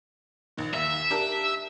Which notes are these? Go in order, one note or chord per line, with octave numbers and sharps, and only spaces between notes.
A#1 D#3
D#2 E5
D4 G4 A#4